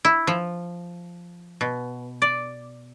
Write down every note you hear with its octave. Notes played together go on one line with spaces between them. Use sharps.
E4
F3
B2
D5